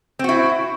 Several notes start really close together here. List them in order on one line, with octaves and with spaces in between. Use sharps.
C4 F#4 E4